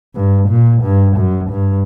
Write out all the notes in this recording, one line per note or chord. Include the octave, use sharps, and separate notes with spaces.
G2
A#2
G2
F#2
G2